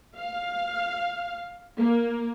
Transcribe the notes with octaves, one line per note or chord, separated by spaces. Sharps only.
F5
A#3